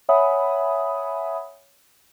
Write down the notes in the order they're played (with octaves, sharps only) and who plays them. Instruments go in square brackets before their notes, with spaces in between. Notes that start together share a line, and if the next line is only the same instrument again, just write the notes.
[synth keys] C#5 E5 F#5 G#5 B5 D#6